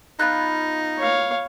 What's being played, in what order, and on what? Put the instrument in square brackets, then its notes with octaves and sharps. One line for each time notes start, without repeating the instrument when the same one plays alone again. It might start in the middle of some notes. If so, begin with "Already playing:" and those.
[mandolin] B3 F4 F#6 [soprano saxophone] D#4
[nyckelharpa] C#5 F5